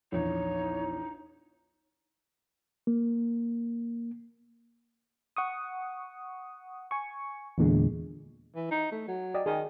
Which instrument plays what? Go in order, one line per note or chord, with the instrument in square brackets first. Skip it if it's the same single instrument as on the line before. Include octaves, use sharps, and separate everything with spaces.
[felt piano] A#1 E2 [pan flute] D#4 [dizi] C#5
[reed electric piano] A#3
[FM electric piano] F#5 C#6 D#6
G#5 C#6
E2 A#2 D3 G#3
[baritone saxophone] E3
D#4
A3
F#3
[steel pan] D5 D#5 G5
[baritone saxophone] D#3 [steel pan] G#4